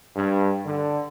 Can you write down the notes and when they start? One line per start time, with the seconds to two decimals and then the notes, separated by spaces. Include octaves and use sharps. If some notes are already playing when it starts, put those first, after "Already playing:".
0.16 G2
0.66 D3